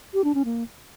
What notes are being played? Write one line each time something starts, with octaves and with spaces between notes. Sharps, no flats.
G4
D4
C#4
A#3